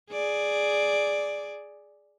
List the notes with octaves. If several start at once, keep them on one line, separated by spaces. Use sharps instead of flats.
G#4 D5